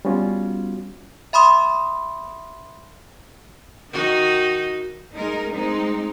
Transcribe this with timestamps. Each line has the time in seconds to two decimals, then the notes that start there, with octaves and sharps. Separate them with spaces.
0.05 G3 B3 C#4 F4 F#4
1.33 E5 B5 C6 D#6
3.91 D#3 D#4 F#4
5.15 G#3 D#4 A#4
5.52 G#3 C4 D#4